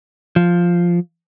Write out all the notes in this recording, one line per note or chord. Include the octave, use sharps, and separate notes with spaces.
F3